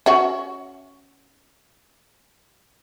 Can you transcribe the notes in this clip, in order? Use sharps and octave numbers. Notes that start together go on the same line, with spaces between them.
C#4 F#4 E5